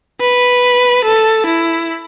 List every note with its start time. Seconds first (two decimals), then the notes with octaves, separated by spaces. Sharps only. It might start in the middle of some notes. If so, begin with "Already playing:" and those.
0.21 B4
1.04 A4
1.46 E4